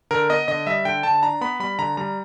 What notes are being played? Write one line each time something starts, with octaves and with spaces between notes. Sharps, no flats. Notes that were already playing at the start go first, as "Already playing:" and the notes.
D3 A#4
B3 D#5
D3 D#5
G3 E5
D3 G5
D3 A5
D4 A#5
B3 B5
G3 B5
D3 A#5
G3 A#5